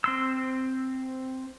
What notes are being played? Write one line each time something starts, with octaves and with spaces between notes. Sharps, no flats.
C4 C6 E6